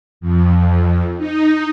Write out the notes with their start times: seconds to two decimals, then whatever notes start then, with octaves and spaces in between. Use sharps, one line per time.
0.21 F2
1.18 D#4